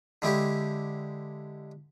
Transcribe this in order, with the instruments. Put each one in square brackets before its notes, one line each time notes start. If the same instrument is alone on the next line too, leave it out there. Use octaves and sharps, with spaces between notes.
[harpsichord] D3 G#3 E4 G4